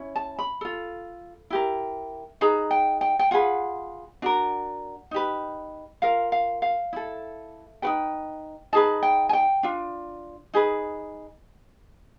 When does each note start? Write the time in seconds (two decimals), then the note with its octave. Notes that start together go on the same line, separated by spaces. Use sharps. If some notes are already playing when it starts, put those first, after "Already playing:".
Already playing: C#4 E4
0.16 A5
0.39 B5
0.61 F4 A4
1.50 E4 G4 A#4
2.41 D#4 G#4 B4 A#5
2.71 G5
3.01 G5
3.19 G5
3.31 F4 G#4 B4 F#5
4.22 D4 F#4 A#4
5.11 D#4 G4 B4
6.02 F4 A#4 F5
6.32 F5
6.62 F5
6.93 E4 A4
7.82 D#4 F#4 B4 G5
8.73 D#4 G#4 B4 A5
9.03 G5
9.29 G#5
9.33 G5
9.63 D4 F4
10.54 D#4 G#4 B4